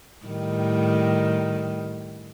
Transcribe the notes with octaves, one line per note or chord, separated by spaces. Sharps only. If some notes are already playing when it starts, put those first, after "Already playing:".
A2 D#3 G3